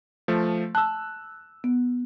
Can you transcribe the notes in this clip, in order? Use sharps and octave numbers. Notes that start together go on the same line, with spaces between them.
F3 A3
A5 E6 F#6
B3